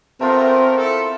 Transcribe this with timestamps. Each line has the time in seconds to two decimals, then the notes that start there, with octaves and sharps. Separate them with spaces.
0.21 A3 B3 C4 F4 A#4
0.77 E4 A4